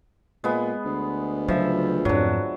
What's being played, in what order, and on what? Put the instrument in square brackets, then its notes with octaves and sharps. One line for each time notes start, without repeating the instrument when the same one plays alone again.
[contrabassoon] A#2 [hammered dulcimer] G#3 B3
[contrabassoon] D2
[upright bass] C#3 F#3 [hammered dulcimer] F3 E5
[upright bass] F2 G#2 [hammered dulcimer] F#3 D4